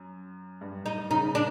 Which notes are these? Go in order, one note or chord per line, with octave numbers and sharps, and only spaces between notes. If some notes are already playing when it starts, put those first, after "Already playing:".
Already playing: F#2
G2
D#4
C#3 D#4
D4